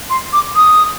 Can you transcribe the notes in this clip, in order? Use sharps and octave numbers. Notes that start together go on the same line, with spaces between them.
C6
D6
D#6